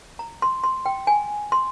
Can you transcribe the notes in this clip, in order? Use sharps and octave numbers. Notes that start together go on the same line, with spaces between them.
A#5
C6
C6
G5
G#5
C6